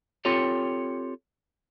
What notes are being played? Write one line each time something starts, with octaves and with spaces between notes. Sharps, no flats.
C4 F4 G4 A4 C#5